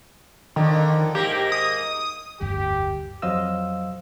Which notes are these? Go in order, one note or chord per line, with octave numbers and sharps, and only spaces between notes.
F2 D3 D#3
G#2 A#3 G4
D#6
F1 D2 G2 G4
F2 F#3 C5 D#5 F5 E6